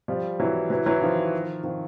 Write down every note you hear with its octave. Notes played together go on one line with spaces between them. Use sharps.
F3 G3
E3 F#3
E3 F#3
E3 F#3
D#3 F3
D#3 F3